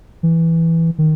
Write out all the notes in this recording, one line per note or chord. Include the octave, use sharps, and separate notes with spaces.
E3
D#3